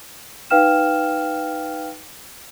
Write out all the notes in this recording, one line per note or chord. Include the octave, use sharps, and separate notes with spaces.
D#4 B4 F5 G5 F6 E7